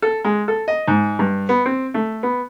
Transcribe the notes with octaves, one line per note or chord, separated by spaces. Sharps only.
A4
G#3
A4
D#5
G#2
G2
B3
C4
A3
B3